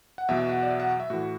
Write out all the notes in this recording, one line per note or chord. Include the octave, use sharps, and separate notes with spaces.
F#5
E2 B2 F#3 E5
F#5
D5
E5
F#5
E5
A2 E3 F#4